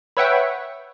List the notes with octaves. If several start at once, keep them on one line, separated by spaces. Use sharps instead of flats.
B4 C#5 E5 F#5 G5